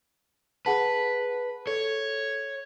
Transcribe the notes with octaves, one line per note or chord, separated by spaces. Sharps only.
G#4 B4 F#5 A5
A4 C#5